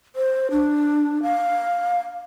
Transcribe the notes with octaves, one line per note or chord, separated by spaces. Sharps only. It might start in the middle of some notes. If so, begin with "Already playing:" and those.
C5
D4
F5